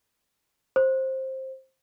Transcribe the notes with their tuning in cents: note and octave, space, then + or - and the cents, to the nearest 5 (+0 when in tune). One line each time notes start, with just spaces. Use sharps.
C5 +15